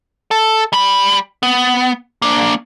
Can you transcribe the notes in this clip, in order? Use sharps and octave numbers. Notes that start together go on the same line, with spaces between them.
A4
G3 B5
B3
A#3 D4